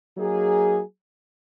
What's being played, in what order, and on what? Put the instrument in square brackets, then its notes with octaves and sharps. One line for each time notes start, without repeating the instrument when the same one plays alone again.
[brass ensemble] F#3 A#3 D#4 G#4